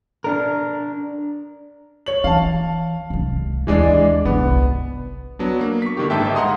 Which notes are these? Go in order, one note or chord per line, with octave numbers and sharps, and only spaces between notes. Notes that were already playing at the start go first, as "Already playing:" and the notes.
D4 A#4
C#5 F#7
E3 F5 A5
C2 G#3
D#2 E3 G#3 D4
G1 C2 B3
F#3 B3 D4
A#3
C#6 B6
D3 D#3 G4
G1 G#2 D#4 E5 G5 A5
F5 F#5 A#5 C6 D#6